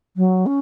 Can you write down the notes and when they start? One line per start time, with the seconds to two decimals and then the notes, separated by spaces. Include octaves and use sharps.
0.17 F#3
0.46 C#4